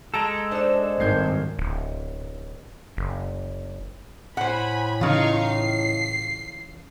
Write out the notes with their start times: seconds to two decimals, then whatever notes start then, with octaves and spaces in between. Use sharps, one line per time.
0.14 G#3 A4 A5 A#5 D7
0.51 D4 D#4 C5 D5 E7
1.00 G#1 G2 G6 G#6 C7
1.59 D1
2.97 F#1
4.37 A2 C5 F#5 G#5 B5
5.01 C#3 E3 D#4 F4 F5 C#6
5.47 C7